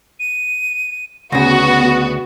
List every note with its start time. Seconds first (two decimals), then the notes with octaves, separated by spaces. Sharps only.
0.20 D#7
1.32 D2 C#3 B3 F#4 A#6